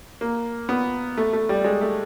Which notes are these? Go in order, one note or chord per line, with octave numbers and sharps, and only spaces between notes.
A#3
B3
A3
A3
G3
G#3
A3